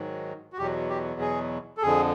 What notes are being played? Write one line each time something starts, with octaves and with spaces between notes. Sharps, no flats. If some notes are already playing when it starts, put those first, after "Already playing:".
Already playing: G#2 D#3 F#3
F#4
E2 B2 F#3 G4
G4
G#4
A4
F2 D3 F3 G#4